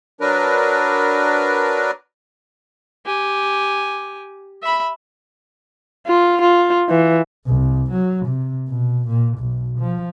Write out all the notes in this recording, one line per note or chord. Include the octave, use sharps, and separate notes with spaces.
F#3 D4 A#4 B4
G4 G#5
E5 B5
F4
F4
E3
C2
F#3
C3
B2
A#2
B1
F3